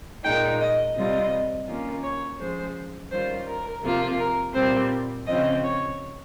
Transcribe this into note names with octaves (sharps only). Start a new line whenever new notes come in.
A#2 G#3 D#4 G5
D#5
C3 G3 C4 F4 D#5
D#3 A#3 C#4 F4
C#5
F3 G#3 C#4 C5
D#3 G3 C#4 F4 C5
A#4
C3 F3 A#3 F4
A#4
A#2 G3 C4 C5
C#3 F3 C4 D#5
C#5